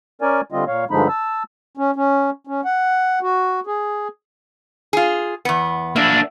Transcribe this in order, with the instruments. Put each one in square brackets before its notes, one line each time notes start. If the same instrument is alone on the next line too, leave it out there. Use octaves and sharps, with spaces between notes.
[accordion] C#4 A#4 D5 G#5
D3 G3 C4 F4 D#5
A#2 C#5 F5
G2 D3 F3 G#3 D#4 B5
A5 E6
[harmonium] C#4
C#4
C#4
F#5
F#4
G#4
[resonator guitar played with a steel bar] F4 G#4
E2 B3
[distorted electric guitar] A#3 D4 [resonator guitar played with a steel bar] E5